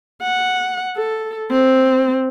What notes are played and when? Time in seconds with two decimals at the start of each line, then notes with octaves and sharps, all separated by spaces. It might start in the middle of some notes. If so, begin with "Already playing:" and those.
0.23 F#5
0.96 A4
1.51 C4